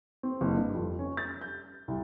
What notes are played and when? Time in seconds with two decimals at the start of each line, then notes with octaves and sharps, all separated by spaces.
0.23 C4
0.41 F#1
0.57 G2
0.74 F2
0.99 C#4
1.17 A6
1.41 G6
1.88 C2